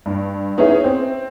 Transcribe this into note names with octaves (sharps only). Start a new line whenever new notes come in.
G2
B3 C#4 D#4 E4 G#4
C4